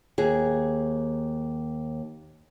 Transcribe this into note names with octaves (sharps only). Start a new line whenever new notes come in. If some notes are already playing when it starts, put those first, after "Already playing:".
D#2 G#4